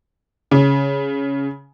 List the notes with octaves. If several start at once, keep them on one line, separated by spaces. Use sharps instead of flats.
C#3